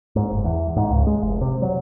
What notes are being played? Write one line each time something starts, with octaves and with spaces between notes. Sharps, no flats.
G#2
F#1
E2
G#2
C#2
G#3
F1
C3
F#3